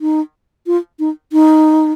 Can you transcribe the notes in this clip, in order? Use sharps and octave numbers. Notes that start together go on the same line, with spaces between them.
D#4
F4
D#4
D#4